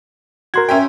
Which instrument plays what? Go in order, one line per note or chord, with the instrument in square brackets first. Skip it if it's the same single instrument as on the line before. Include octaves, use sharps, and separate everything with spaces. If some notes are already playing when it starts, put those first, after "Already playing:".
[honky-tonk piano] F#4 [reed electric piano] A#4 C6 G#6
[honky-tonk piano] C#4 E5 G5